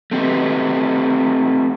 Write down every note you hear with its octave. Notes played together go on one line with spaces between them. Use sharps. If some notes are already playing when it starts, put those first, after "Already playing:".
A3 C4 G4 B4